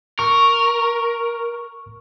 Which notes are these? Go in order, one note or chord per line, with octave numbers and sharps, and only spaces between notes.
A#4 C#6